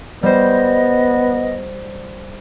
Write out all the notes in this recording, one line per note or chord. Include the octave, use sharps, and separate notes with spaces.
G3 B3 C5 D#5